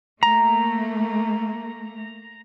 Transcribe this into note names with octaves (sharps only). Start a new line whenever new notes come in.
A3 A#3 A#5